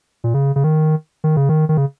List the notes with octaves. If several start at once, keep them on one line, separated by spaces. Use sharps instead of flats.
A#2
C#3
C#3
D#3
D#3
C#3
D#3
D#3
C#3